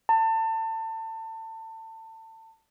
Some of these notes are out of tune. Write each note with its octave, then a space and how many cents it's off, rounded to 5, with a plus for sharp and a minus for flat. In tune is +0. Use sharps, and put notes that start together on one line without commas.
A5 +30